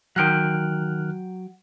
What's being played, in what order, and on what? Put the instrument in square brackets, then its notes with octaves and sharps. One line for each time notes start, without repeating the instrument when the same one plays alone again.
[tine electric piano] D#3 F6 F#6 [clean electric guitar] F#3 G5